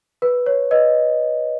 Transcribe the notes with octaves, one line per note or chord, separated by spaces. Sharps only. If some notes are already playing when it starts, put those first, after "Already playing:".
B4
C#5
B4 D#5